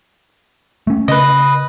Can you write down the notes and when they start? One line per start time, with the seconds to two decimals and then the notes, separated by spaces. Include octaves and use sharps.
0.87 A3 C#4
1.08 C#3 B4 D#5